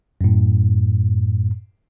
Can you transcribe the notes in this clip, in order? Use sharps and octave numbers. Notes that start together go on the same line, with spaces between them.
F#2 A2